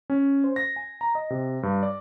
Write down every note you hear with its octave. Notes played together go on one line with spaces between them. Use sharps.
C#4
C5
A#6
G#5
A#5
D#5
C3
G2
D5